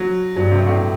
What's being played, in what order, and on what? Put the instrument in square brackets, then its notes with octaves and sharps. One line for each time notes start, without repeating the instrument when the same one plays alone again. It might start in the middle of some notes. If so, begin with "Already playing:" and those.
Already playing: [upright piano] F#3
[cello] G2 [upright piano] F#3
[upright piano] C3
A2